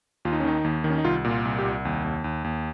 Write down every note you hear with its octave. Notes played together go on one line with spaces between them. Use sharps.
D#2 F4
D#4
C#4
D#3 D#4
D#2
D#3
C#4
D#4
C2 F4
A#2
F4
C2
G4
C2
D#2
D#2
D#2
D#2